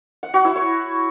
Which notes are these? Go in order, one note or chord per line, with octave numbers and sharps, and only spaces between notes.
F#5
F#4
E4
C#5